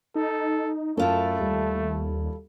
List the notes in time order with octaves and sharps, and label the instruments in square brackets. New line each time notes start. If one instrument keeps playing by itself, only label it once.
[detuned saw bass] D#4 [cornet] A4
[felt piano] F#2 [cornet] A3 [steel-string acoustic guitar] E4 F4 A4
[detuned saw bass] D#2 [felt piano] G3